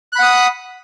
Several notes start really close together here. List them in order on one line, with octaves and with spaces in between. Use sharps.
F#6 B5 F#5 D#6